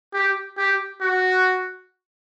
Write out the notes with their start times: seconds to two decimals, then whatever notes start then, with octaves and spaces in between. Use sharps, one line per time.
0.13 G4
0.57 G4
1.01 F#4